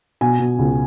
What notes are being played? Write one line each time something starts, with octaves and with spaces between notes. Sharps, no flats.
B2 G#5
B2
C#2